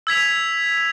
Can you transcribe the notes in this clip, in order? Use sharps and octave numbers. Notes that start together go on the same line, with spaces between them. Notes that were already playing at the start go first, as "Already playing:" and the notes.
E6 G#6 B6 F7